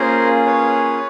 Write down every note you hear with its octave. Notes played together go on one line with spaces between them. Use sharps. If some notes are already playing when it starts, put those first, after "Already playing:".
Already playing: A#3 C#4 F4 G#4 A#4 C5
B4 C#5